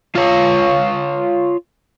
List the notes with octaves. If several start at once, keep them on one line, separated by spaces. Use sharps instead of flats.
F4 C#5